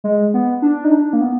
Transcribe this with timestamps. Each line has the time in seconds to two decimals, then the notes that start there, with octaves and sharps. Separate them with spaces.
0.04 G#3
0.34 B3
0.62 D4
0.84 D#4
0.91 D4
1.13 A#3
1.21 B3